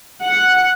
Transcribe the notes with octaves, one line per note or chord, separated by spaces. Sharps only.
F#5